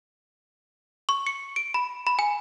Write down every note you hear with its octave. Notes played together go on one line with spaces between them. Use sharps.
C#6
C#7
D7
B5
B5
G#5